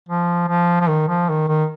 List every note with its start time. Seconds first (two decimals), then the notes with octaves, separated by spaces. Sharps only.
0.09 F3
0.48 F3
0.81 F3
0.89 D#3
1.08 F3
1.29 D#3
1.48 D#3